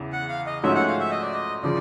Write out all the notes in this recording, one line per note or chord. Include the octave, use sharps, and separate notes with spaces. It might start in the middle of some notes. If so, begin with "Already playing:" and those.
Already playing: E2 C#3 E3
F#5
F5
D#5
G#2 F3 A3 C#4 F#4 E5
F#5
F5
E5
D#5
D5
D#5
C#3 F3 D5